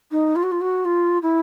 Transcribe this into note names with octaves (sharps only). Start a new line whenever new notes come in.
D#4
F4
F#4
F4
F#4
F4
E4